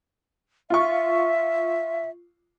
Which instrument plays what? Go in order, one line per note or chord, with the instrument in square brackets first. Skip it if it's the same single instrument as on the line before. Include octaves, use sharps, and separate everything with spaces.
[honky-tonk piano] F4 C#6 [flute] E5